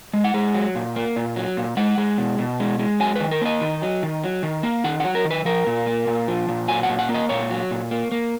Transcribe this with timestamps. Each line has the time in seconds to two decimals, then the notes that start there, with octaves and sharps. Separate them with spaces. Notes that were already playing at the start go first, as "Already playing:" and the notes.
0.13 G#3
0.24 F#5
0.34 G#3
0.55 F#3
0.75 A#2
0.96 A#3
1.16 A#2
1.36 F#3
1.57 A#2
1.77 G#3 F#5
1.98 G#3
2.18 B2
2.39 B2
2.60 G#3
2.79 G#3
3.00 F#3 G#5
3.16 D#3 B4
3.31 A#4
3.41 A#3 D#5
3.61 D#3
3.82 F#3
4.03 D#3
4.24 F#3
4.43 D#3
4.63 A#3
4.84 D#3 F#5
5.00 F#3 F#5
5.15 A#4
5.25 D#3
5.31 B4
5.45 F3 A#4
5.67 A#2
5.86 A#3
6.07 A#2
6.28 F3
6.49 A#2
6.68 F#3 G#5
6.83 F#5
6.89 A#2
6.99 F#5
7.09 A#3
7.14 D#5
7.29 A#2 C#5
7.51 F#3
7.71 A#2
7.91 A#3
8.12 A#3